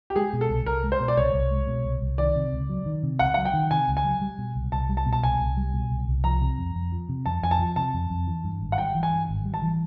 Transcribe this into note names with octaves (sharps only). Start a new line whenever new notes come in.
G4
G#3 G#4
B2
A4
C2
C2 A#4
G#3
C5
B2
D5
C2 C#5
C2
G#3
B2
C2
C2
D#3 D5
C3
C#2
F#3
D#3
C3
C#2 F#5
F#3 F#5
G5
D#3
C3 G#5
C#2
G#5
F#3
G3
B2
C2
C2 A5
G3
A5
B2
A5
C2 G#5
C2
G3
B2
C2
C2
F3 A#5
C3
F2
F2
F3
C3
F2 A5
F2 G#5
A5
F3
C3 A5
F2
F2
E3
G2
G#1
F#5
G3 G5
E3
G#5
G2
G#1
G3
A5
E3